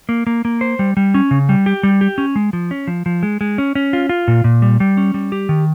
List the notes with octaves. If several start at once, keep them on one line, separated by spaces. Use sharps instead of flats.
A#3
A#3
A#3
C5
G3
G3
C#4
C#3
G3
G4
G3
G4
C#4
G#3
F3
C#4
F3
F3
G#3
G#3
C#4
C#4
F4
F4
A#2
A#2
G3
G3
C#4
G3
G4
D#3